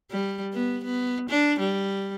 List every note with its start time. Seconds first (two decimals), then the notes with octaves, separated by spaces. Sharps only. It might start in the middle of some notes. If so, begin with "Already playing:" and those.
0.11 G3
0.53 B3
0.84 B3
1.30 D4
1.60 G3